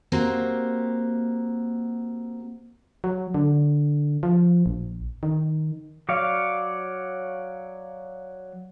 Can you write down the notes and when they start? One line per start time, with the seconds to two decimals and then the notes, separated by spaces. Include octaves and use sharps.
0.12 A#3 C4 F#4 G4
3.04 F#3
3.34 D3
4.23 F3
4.66 A#1
5.23 D#3
6.09 F#3 C#5 D5 F5